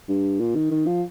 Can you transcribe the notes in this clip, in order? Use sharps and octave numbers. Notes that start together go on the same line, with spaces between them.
G2
A#2
D#3
D#3
F3